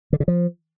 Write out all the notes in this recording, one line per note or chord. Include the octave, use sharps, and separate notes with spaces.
D3
C#3
F3